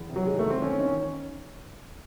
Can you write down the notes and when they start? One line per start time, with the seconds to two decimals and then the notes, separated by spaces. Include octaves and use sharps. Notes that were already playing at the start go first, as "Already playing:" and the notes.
Already playing: E2
0.09 C3
0.16 F#3
0.27 D#3 G#3
0.39 A3
0.44 E2
0.50 C4
0.61 D#2 C#4
0.79 D#3 C#4